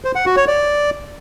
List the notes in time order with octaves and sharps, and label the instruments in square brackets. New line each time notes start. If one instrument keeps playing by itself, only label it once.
[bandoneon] C5
F#5
F#4
C#5
D5